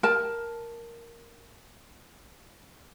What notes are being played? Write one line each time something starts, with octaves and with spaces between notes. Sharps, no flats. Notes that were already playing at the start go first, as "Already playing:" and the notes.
A#4 A5